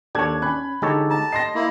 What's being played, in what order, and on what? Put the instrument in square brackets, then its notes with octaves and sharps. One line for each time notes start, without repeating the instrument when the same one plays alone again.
[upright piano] D#2 G#6 [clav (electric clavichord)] D4 C#5 [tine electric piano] A4
[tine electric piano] C#4 [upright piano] B5 F#6
[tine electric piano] D3 G#3 D#4 [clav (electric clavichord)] G4 A4 C#5
[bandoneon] A5 [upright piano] A#5
[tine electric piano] D#5 C6 [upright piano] A#6 C7
[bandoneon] A#3 E4